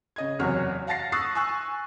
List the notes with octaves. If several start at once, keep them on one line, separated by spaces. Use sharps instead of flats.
C#3 D#5 G#6
F#1 E2 C3 F#4 C#5 F6
F5 F#5 A5 A6 A#6 C7
C#6 D#6 E6 F#6 A6 C7
G#5 C#6 E6 F#6